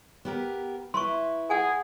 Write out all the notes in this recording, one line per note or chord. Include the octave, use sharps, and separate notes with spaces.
B3 G4 A#4
E4 B4 C6 C#6
G#4 F#5 G#5